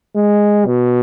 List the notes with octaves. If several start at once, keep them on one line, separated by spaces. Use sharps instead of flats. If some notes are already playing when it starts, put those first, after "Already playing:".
G#3
B2